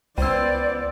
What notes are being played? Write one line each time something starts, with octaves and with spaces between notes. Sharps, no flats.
C#2 B3 C5 D5 G5 E6